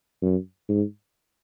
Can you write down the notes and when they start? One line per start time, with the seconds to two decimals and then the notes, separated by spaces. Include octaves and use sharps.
0.22 F#2
0.68 G#2